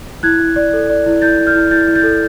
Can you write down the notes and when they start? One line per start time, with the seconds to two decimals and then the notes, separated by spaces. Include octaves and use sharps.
0.23 E4 F#6 G#6
0.40 E4
0.56 D5
0.73 A4
0.90 D5
1.06 E4
1.22 E4 G6 A6
1.38 E4
1.47 F6 G6
1.55 E4
1.71 E4 G6 A6
1.88 E4
1.95 G6 A6
2.04 A4